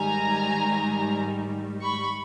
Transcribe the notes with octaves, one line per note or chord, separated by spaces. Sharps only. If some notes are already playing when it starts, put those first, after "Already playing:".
Already playing: G#2 D#3 G3 G#5 A#5
B5 C#6